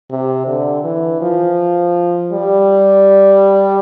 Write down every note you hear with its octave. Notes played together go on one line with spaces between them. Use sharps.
C3
D3
E3
F3
G3